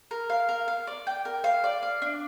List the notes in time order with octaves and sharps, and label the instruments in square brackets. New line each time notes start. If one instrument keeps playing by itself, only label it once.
[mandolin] A#4
F5
A#4
F5
D5
G5
A#4
F5
D5
F5
D4